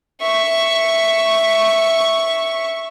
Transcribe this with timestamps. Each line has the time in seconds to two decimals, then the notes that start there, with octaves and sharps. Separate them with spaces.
0.22 E5 C#6